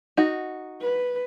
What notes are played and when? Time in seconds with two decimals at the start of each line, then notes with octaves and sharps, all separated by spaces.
0.17 D#4 F#4
0.81 B4